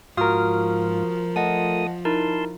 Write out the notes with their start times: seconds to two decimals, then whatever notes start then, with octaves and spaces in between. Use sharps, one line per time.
0.17 G#2 F3 F4 F#4 A#4 D#6 F6
1.36 A3 D#5 F#5 A5 D#6
2.05 D#4 E4 A#4 A5 C6